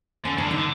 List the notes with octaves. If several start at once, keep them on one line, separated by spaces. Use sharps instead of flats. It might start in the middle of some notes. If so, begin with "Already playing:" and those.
D3 C#4
C#3 D4
D3
D#4
D3